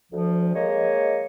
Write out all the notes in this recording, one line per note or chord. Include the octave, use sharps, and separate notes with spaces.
D2 F3
G#3 A#3 C#5 D#5